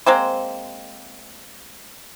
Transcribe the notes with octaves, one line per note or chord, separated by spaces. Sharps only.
G#3 A#3 C4 C5